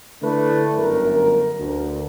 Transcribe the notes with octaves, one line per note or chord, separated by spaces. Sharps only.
D3 A3 D4 E4 B4
G1 F#2 A#4
D2